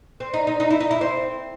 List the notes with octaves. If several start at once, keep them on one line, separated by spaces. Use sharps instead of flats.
C4
D#4
D#4
D#4
E4
D#4
E4
C4